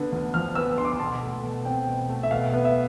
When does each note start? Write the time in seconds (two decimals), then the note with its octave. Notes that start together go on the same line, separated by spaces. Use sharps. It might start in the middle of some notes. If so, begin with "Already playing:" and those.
Already playing: D3 B3
0.12 D2
0.34 F3 F6
0.55 B3 E6
0.78 D3 C6
0.85 D6
0.92 C6
1.00 B2 A5
1.22 A3
1.43 B2
1.65 C4 G5
1.87 B2
2.09 A3
2.23 E5
2.31 B2 F5
2.53 B3
2.65 E5